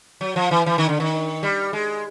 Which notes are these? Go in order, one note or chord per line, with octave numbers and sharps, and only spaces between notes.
F#3
F3
E3
E3
D#3
D3
D#3
G3
G#3